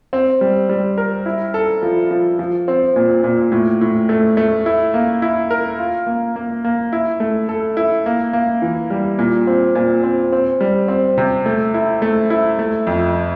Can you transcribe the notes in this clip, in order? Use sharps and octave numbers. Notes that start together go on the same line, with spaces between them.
C4
G3
G3
A#4
E4
A4
F3
F3
F3
C4
A#2
A#2
A2
A2
A3
A3
E4
A#3
E4
A#4
F4
A#3
A#3
A#3
E4
A3
A4
E4
A#3
A#3
E3
G3
A#2
C4
A#2
C4
C4
G3
C4
C3
A3
E4
A3
E4
A3
F2